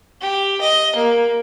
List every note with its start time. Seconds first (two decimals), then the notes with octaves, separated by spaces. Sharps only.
0.21 G4
0.61 D#5
0.96 A#3